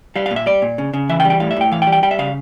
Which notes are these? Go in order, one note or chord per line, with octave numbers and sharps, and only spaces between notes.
G3 F5
F5
A#2
E5
G3 D5
A#2
C#3
C#3
E3 E5
G5
G3
G5
A2 F5
E5
A2 G5
E3 F5
G5
G3
G5
G3 G5
E5
C#3 F5